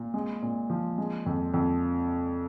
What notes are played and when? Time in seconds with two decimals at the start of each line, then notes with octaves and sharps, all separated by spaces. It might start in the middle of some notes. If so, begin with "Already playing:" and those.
Already playing: A#2
0.14 G#3
0.42 A#2
0.70 F3
0.98 G#3
1.26 F2
1.54 F2